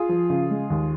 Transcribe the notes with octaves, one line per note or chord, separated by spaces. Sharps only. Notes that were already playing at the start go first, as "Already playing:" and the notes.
Already playing: F4 G#4
F3
C#3
G#3
D#2